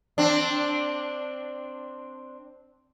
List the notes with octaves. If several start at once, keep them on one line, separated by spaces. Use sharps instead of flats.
C4 D4